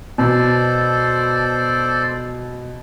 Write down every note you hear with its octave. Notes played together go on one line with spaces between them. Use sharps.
B2 A4 C5 D5